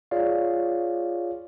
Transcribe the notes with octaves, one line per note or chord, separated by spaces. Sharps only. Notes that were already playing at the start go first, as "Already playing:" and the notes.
F4 G#4 C#5 D5 F5